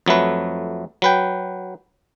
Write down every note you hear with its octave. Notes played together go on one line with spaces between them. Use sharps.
F2 F#3 A3 B4
F#3 B4 G5